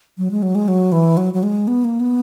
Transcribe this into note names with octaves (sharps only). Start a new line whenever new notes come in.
F#3
G#3
F#3
G#3
F#3
E3
F#3
F#3
G#3
B3
A#3
B3